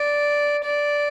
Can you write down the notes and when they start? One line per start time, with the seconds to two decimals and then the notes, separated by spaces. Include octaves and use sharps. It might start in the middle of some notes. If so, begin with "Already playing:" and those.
Already playing: D5
0.64 D5